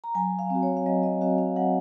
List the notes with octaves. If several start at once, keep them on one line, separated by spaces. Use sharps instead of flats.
A#5
F#3 G#5
F5
C4 F#4
C#5
F5
F#3 D#5
D#5
C4 F#4 F5
F5
F#3 F#5